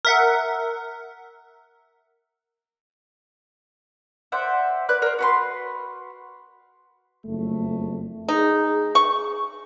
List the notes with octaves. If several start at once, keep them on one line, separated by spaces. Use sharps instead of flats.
A#4 E5 F#5
C5 D5 E5 F#5
B4 D5 F#6
A#4 C5
F#4 B4 C6
F#1 F2 A3
D#4 G#4
C#6